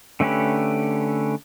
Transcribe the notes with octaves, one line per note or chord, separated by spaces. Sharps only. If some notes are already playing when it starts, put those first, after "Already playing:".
D3 A3 C#4 G4 B4